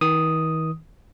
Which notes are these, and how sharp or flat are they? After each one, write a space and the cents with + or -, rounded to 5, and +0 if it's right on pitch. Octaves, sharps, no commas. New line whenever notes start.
D#3 +45 D#6 +0